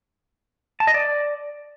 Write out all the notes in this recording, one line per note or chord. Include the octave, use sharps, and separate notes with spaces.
A5
D#5
D5